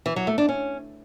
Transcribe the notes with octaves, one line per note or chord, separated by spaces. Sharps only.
E3
F#3
A3
D4
C#4